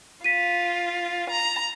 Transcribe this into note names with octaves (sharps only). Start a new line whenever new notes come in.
F4 B6 D#7
A#5